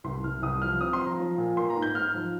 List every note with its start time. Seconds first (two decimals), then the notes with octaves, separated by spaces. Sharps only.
0.04 C2 C6
0.24 C2 F6
0.42 C2 D#6
0.62 F3 F6
0.81 C4 D#6
0.93 C6
0.99 F3
1.06 A#5
1.19 F3
1.38 A#2
1.57 A#3 C6
1.70 A#5
1.77 G#2
1.82 G6
1.95 G#2 F6
2.14 F3